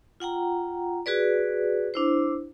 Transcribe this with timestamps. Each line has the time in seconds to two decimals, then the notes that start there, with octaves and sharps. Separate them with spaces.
0.20 F4 F#5 G5 A#5
1.06 F#4 G#4 B4 D5
1.94 D4 E4 C5